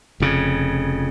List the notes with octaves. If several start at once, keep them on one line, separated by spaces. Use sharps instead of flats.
F1 F2 C#3